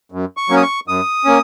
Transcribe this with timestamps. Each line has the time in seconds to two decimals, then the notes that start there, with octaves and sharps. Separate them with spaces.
0.12 F#2
0.37 C#6
0.49 F#3 A#3 C#4
0.57 D#6
0.63 C#6
0.87 F#2 D#6
1.25 A#3 C#4